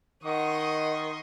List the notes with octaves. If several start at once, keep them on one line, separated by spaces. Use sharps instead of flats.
D#3 D#5 F#5 C6 C#6 D#6